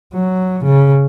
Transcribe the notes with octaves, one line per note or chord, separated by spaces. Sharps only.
F#3
C#3